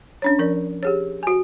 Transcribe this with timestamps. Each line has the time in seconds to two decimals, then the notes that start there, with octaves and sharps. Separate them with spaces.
0.22 C#4 D4 C#5
0.39 F3 A#4 D5
0.83 G4 G#4 C#5
1.23 F#4 G#5